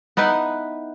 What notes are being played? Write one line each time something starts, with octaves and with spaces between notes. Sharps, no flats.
B3 D#4 E4 B4